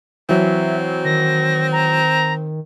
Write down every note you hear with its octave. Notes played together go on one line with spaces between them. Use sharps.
E3 F#3 C4 E5
D#3 A#6
A#5